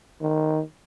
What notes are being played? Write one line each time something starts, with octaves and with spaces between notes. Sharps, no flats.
D#3